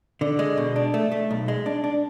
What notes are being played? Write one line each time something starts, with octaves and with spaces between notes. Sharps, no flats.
D3
G#3
B2
D4
A3
A3
B1
G#3
D4
D4